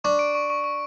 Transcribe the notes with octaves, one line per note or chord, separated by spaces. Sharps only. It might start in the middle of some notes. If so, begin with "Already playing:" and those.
D4 C#6
D7
C#6
C#6
C#6